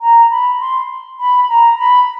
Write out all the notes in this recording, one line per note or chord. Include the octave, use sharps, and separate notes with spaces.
A#5
B5
C6
B5
A#5
B5